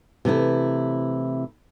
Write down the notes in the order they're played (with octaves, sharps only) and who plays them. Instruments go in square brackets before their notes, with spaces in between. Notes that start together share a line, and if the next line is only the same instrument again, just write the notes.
[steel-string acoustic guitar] C3 E3 A3 E4